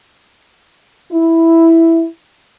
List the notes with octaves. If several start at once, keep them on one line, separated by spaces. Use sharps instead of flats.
E4